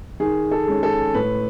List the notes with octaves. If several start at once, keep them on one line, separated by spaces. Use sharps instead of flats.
D#3 G#4
A4
G#3 C#4
A4
A2 B4